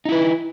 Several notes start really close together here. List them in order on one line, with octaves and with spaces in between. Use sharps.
D#4 E4 B4